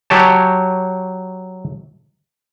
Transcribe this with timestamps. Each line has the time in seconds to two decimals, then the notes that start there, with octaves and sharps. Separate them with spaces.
0.10 F#3 G4 C#5 A5